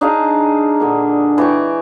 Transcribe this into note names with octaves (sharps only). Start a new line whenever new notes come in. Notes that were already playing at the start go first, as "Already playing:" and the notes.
D4 D#4 G#4 F5
A#2 D3
E3 G5 C#6